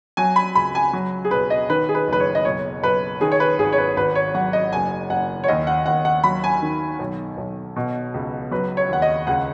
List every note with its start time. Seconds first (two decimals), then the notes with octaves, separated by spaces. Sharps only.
0.17 F#3 G#5
0.36 B5
0.55 C#2 B5
0.75 G#5
0.93 F#3
1.25 G#4
1.31 B1 B4
1.50 D#5
1.70 D#3 B4
1.89 G#4
1.95 B4
2.08 F#1 B4
2.20 C#5
2.35 D#5
2.45 B1 C#5
2.83 B1 B4
3.21 D#3 G#4
3.32 C#5
3.40 B4
3.58 G#1 G#4
3.73 C#5
3.78 B4
3.96 G#1 B4
4.15 C#5
4.34 F#3 F#5
4.53 D#5
4.73 F#1 G#5
5.10 F#1 F#5
5.44 C#5
5.48 D#2 D#5
5.67 F#5
5.86 D#2 F#5
6.05 F#5
6.24 F#3 B5
6.44 G#5
6.62 D#3
6.99 B1
7.38 B1
7.76 B2
8.14 C#2
8.51 F#3 B4
8.77 C#5
8.89 D#2 F#5
9.02 D#5
9.27 C#2 F#5